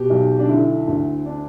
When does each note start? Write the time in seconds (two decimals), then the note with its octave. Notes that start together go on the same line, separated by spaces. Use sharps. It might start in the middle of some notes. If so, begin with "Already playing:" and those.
Already playing: B2 G4
0.10 B1
0.39 D4
0.48 D3 E4
0.87 D2
1.25 D4